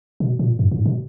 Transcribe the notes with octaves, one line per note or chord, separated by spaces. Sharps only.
B2
A#2
F#2
G#2
B2